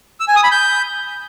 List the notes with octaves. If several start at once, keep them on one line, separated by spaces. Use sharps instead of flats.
E6
G#5
D#6
B5
G6